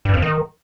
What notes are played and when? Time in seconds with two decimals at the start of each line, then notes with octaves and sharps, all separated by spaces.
0.05 G2
0.14 F2
0.22 D#3